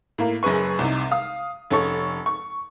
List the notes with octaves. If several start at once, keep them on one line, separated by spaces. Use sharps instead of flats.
A2 A#3
F#1 F#2 G#4 B4 C#6
C2 C3 D#4
F5 D#6
F1 C#4 A4 C#6
C#6